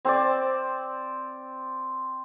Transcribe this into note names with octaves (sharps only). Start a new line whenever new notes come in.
C4 C5 D5